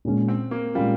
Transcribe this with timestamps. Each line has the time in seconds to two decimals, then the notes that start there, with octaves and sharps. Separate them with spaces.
0.05 A#2 G#3 C#4 F4
0.28 C4
0.51 A#3
0.75 A#2 G3 G#3 C#4 F4